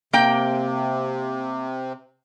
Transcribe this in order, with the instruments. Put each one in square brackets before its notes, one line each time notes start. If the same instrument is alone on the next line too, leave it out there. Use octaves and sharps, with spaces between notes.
[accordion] C3 [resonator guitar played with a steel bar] A#3 G5